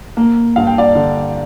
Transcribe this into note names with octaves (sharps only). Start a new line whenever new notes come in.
A#3
G2 F5
G5
D5 F5
D3